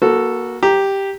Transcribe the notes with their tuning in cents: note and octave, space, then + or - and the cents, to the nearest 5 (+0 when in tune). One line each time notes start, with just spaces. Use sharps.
A#3 +25 F#4 +0 A4 +0
G4 +0 A#5 +0